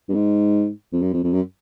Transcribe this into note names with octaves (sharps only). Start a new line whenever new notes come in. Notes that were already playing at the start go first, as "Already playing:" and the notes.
G2
G#2
F2
F#2
F2
F2
F#2